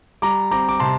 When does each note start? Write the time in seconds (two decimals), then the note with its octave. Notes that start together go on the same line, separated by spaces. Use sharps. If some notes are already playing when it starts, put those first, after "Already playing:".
0.22 G3 A#5 D6
0.51 C4 A#5 D6
0.69 D6
0.80 C3 A5 C6